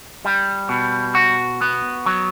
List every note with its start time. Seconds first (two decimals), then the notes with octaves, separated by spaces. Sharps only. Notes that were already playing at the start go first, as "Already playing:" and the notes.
0.25 G3
0.69 B2
1.15 F#4
1.61 B3
2.06 F#3